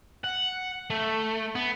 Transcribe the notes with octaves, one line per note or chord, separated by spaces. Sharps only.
F#5
A3
B3